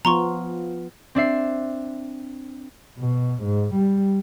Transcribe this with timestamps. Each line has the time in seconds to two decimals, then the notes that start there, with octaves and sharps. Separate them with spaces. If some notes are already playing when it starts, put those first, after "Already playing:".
0.05 F3 B3 F4 A#5 C6 C#6
1.15 C4 D4 E5 C7
2.98 B2
3.43 G#2
3.74 G3